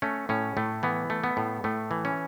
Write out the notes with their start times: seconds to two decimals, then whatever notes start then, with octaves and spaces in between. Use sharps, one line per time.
0.02 A3 C#4
0.29 A2 C#4
0.57 A2 A3
0.83 E3 B3
1.10 A3
1.24 B3
1.37 A2
1.64 A2 A3
1.91 E3
2.05 C#4